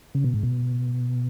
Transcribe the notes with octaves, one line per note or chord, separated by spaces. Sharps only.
C#3
B2
G#2
B2